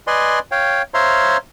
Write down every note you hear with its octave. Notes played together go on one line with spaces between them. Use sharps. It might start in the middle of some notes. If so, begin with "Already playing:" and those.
B4 D5 D#5 G#5 C6
C#5 F5 G5
C5 C#5 E5 F5 A#5 C6